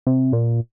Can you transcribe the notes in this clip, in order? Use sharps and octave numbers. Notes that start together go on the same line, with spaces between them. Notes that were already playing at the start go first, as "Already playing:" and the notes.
C3
A#2